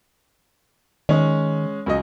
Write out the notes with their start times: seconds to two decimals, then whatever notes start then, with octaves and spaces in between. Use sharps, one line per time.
1.09 D#3 G#3 C#4
1.86 C#2 F#3 D#5